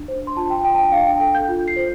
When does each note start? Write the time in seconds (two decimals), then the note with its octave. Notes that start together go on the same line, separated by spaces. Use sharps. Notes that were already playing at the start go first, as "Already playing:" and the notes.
Already playing: D4
0.08 C5
0.27 C6
0.37 F4 A5
0.50 G5
0.64 D4 G5
0.74 A5
0.78 G5
0.92 D4 F5
1.07 G5
1.20 A4 G5
1.35 G6
1.48 F4
1.68 C7
1.76 C5